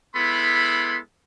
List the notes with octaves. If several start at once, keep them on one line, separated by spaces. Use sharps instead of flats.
G#3 B3 E4 A4 B5 C6